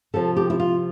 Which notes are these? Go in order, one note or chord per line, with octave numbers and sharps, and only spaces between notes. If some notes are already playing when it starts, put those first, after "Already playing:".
C3 F3 A4
G4
E4
F4